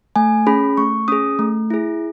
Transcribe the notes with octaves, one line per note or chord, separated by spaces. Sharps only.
A3 G#5
C#4 G#4 B5
A3 C#6
C#4 G#4 D#6
A3
E4 G#4